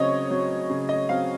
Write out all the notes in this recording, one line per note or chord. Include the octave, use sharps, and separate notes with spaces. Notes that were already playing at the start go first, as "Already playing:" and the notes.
Already playing: C#3 F#3 C4 C#5 D#5
F#3 C4
C#3
D#5
F#3 C4 F5